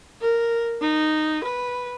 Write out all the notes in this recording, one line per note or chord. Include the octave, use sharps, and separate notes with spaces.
A#4
D#4
B4